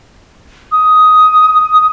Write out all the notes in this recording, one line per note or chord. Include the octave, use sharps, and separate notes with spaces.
D#6